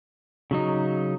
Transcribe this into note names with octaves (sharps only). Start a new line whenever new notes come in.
C#3 F#3 D#4